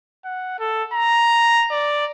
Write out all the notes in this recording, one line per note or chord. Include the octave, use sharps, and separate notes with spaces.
F#5
A4
A#5
D5